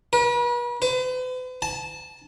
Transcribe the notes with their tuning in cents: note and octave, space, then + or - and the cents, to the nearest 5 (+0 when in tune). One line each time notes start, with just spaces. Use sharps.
B4 -40
B4 +45
A5 -20